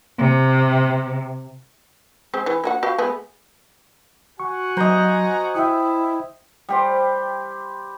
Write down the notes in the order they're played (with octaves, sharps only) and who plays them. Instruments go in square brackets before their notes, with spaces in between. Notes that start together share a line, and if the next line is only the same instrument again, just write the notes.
[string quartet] C3
[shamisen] G#3 C4 G4
E3
A#3 F#4 F#5
F#4 G4 F5
G#3 A3 B3
[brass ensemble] F#4 F#5 G#5 [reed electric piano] C#6
[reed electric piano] F#3 [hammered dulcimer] C5 D#5 [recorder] A#5
[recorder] E4 [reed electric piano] E5 G5 D#6
[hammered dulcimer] G3 G4 C5